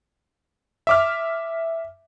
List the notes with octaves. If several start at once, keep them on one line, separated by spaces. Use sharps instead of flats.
E5 D6 F6